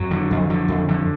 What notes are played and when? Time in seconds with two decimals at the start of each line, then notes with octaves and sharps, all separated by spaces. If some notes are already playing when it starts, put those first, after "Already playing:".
Already playing: F2 F#3
0.11 D3
0.31 F2
0.50 D3
0.68 F2
0.88 D3